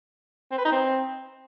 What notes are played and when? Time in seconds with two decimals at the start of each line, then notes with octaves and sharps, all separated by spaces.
0.51 C4
0.58 B4
0.65 D#4
0.72 C4